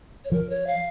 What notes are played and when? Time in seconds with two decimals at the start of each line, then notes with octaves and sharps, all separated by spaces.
0.25 C#5
0.32 F3 A#4
0.50 C#5
0.67 F5